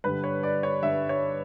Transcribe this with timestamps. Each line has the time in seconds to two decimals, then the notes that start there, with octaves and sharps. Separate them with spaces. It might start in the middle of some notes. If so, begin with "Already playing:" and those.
0.04 G2 D3 G3 B4
0.24 C#5
0.43 D5
0.63 C#5
0.82 G2 D3 G3 E5
1.09 C#5